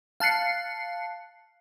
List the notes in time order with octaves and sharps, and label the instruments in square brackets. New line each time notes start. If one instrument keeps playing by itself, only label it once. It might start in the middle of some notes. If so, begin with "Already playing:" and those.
[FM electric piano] F5 A5 F#6 C7 C#7